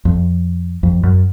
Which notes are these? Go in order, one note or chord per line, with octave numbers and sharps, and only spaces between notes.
F2
F2
F#2